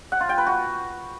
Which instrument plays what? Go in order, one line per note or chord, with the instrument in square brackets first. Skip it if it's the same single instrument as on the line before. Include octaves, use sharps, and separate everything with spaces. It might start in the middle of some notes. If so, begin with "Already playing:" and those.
[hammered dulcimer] F#5
F4
G5
B4
F#4